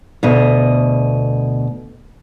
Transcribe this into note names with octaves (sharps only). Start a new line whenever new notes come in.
D2 B2 D#5